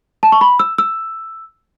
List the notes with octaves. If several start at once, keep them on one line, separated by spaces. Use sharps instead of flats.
A5
C#6
B5
E6
E6